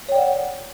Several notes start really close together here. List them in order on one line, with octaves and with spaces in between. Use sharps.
C#5 G5 D5 F#5